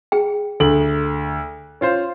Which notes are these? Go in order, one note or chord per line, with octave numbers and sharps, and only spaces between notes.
G#4 G5
D2 A4 F#7
C#4 F4 C5